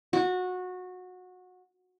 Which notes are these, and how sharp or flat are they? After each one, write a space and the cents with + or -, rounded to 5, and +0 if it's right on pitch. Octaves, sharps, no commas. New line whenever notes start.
F#4 -20